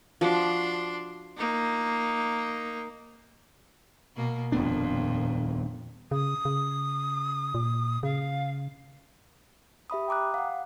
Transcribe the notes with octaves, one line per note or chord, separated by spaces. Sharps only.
F3 D4 F#4 D5 C6
A#3 D#4
B2 A#3
D#1 F2 A#2 B3 D4
C#3 D#6
C#3
A#2
C#3 F5
G4 E5 B5 D#6
G5 A#5 D6 D#6 F#6
F5 F#5